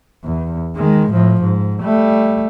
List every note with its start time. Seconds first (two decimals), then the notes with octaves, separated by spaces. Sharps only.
0.24 E2
0.76 D#3 G#3
1.10 A2 F3
1.41 G#2
1.82 G3 A3